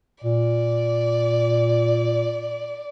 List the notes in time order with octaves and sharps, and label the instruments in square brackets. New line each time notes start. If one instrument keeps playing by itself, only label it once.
[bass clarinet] A#2 [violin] D5